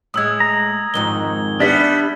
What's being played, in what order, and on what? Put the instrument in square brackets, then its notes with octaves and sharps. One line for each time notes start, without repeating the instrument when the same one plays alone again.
[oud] A2 G#3 [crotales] D#6 E6 G#6
[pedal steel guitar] A#5
[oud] F2 G#2 D#3 [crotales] G7
[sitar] G3 B3 [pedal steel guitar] D4 E5